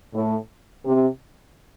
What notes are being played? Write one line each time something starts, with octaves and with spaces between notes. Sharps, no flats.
A2
C3